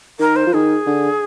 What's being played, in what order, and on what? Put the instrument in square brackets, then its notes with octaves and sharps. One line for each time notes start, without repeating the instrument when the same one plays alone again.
[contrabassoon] D#3 [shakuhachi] A#4
[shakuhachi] C5
[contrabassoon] F3
[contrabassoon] D#3 [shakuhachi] G#4
[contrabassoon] D3